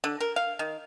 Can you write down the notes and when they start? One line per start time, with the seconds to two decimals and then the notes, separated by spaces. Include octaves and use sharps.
0.04 D3
0.20 A#4
0.36 F5
0.59 D#3